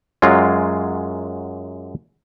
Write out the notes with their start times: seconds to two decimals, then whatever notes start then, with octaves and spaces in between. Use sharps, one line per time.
0.22 F#2 F#3 G#3 F4